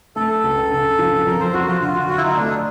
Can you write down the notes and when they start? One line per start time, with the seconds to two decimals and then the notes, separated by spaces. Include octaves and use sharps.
0.16 A3 A4
0.44 C#2
0.71 C#3
0.99 F3
1.27 F2 A#4
1.40 C5
1.54 F2 F#4
1.68 F4
1.81 D3 F4
1.95 F#4
2.09 F#3 F4
2.17 E4
2.23 D#4
2.36 A3 D4